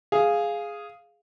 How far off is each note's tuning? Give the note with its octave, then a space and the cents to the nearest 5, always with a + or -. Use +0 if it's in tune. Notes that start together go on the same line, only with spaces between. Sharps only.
G#4 +0 F5 +0